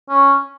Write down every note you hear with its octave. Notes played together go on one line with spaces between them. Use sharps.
C#4